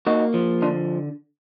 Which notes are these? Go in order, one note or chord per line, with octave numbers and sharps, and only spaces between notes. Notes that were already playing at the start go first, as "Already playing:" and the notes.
A#3 D#4 F#4
F3
D3 D4 F4